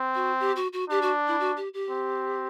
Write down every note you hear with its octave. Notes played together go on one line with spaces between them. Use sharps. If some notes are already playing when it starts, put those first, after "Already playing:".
Already playing: C4
F#4
G4
F#4
F#4
D4 G4
F#4
E4
F#4
G4
G4
C4